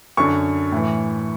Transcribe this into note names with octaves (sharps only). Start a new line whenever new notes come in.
F#2 D3 C#6
A2 E3